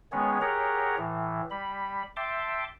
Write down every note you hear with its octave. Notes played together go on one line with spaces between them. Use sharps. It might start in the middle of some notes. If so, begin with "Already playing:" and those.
D#3 G#3 B3 C#4 G#4 C#5
G4 G#4 A#4 C#5 F#5 A#5
A2 E3
G3 B5
E5 G5 A5 C6 D6